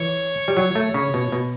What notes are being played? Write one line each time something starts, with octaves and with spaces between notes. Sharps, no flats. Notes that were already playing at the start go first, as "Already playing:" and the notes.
Already playing: E3 C#5
G3
F#3
A3
C#3
B2
B2